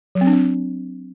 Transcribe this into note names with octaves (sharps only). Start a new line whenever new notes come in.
F#3
C4
D4
C4